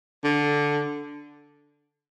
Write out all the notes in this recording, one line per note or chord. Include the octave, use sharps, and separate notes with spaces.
D3